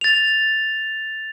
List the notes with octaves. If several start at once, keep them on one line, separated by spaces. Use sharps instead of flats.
A6 F7